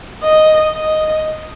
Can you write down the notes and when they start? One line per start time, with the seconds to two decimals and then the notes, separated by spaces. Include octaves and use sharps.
0.23 D#5
0.76 D#5